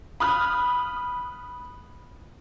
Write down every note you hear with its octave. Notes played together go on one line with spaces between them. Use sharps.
B5 D#6 F6 F#6